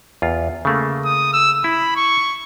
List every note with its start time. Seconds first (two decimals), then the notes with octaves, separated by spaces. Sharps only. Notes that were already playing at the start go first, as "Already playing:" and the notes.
0.22 E2 F4
0.65 C#3 A3 A#3
1.05 D#6
1.33 E6
1.64 E4 B5
1.96 C#6